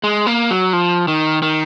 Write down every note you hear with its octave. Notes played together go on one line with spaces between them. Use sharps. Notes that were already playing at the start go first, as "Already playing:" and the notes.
G#3
A#3
F#3
F3
D#3
D#3